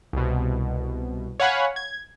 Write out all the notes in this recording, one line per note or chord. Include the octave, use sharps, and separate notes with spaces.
C2 B2
C#5 F5 F#5 G#5 B5 C#6
G#6